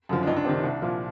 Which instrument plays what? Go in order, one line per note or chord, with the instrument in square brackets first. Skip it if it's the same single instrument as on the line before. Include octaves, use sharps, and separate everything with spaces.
[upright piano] F#2 D3 F3
D4
C#2 D#4
D4
C3 D#3 C4
D4
C2
A#2 F3